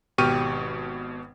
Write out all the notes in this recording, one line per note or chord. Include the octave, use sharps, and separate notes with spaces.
G#1 B2 G4 C#6 F6 D#7